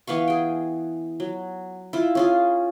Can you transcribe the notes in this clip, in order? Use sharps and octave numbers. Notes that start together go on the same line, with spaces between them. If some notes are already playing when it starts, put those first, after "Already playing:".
E3 B3 F5 C#6
G#4 G5
F#3
E4 F4
C#4 F4 G#4